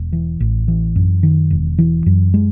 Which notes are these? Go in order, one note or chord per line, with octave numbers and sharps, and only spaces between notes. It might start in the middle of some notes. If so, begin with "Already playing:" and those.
Already playing: E1
E3
A1
E3
F#2
D#3
E1
E3
F#2
G#3